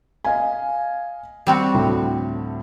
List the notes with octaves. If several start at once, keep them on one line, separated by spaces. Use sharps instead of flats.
D#5 F5 G#5
G3 C4 F#4
D2 A2